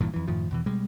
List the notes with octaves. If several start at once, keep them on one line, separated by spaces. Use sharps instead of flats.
A#1 G2 A#2 E3
F2 E3
F#2 A2 D#3 F3
E2 B2 E3
B2 G3 G#3